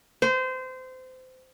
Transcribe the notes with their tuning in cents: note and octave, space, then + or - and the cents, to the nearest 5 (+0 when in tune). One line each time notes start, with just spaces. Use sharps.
C5 -25